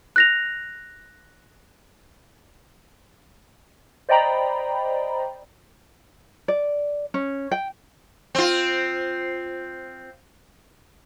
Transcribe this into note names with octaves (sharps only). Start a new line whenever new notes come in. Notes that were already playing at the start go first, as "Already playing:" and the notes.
F#6 A#6 F7
C5 D5 D#5 G5 A#5 B5
D5
C#4
G5
C4 F4